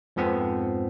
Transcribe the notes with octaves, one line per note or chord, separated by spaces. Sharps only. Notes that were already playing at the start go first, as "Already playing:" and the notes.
F2 G#2 F3 B3 C4